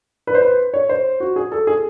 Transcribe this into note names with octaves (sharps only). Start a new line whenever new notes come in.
B4
C5
B4
C#5
C5
F#4
G#4
A4
G#4